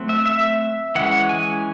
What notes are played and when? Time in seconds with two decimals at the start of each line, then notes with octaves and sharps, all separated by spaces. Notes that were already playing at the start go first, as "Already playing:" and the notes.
Already playing: F#3 A3 C4
0.09 E5
0.26 E5
0.95 E3 G#3 C#4 F#5
1.29 G#5